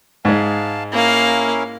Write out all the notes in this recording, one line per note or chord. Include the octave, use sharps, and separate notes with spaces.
G#2 G#3 F5 A5
A#3 C#4 E4 A#4 F5